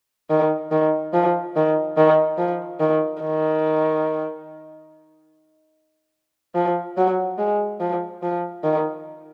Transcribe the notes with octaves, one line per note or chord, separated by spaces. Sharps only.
D#3
D#3
F3
D#3
D#3
F3
D#3
D#3
F3
F#3
G#3
F3
F3
D#3